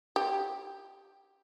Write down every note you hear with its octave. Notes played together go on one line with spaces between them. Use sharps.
G4